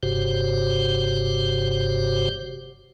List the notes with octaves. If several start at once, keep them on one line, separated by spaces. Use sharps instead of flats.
F#1 G2 C3 F#4 G4 C5